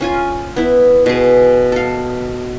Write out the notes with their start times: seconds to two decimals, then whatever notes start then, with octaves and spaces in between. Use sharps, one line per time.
0.01 C#4 F4 G#5
0.56 B3 E4
1.06 B2 G#4
1.72 A4 F5